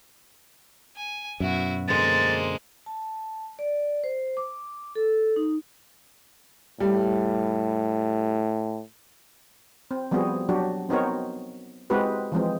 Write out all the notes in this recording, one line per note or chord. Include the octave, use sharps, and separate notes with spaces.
G#5
F#2 B2 E4 F#4
D3 G#3 A#3 C5 A6
A5
D5
C5
D6
A4
D#4
A2 G3
C4
F3 G3 B3 C4 F#4 G#4
F#3 D4 F#4 G4
B3 C4 D#4 F#4 A#4 C#5
G#3 C4 E4 F#4 G4 B4
E3 F3 G#3 C4